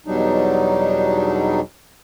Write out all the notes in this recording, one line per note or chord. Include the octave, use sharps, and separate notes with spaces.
E2 B2 F#3 G3 D4 D#4